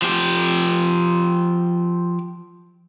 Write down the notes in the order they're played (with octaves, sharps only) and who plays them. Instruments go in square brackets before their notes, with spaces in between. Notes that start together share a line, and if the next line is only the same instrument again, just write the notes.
[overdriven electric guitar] F3 G4